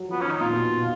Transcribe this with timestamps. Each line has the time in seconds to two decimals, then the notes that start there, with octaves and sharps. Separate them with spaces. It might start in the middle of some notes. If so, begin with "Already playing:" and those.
Already playing: F#3
0.09 F3 B3
0.21 D#3 C#4
0.31 D#4
0.41 A#2 F4
0.53 B2
0.76 B2